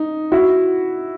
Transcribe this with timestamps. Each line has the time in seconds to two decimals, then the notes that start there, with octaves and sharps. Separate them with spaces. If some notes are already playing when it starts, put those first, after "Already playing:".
Already playing: D#4
0.32 E4 F#4